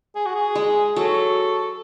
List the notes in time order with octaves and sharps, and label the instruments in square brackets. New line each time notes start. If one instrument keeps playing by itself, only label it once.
[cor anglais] G#4
F#4
G#4
[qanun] G#3
[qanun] F#3 [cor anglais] A4